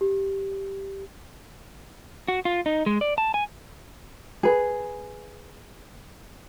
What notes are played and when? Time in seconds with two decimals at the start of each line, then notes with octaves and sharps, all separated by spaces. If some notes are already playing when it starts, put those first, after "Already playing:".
0.01 G4
2.28 F#4
2.45 F4
2.66 D#4
2.86 G#3
3.01 D5
3.18 A5
3.34 G#5
4.43 G#4 B4